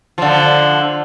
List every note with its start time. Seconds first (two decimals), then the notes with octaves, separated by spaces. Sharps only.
0.18 D3 F3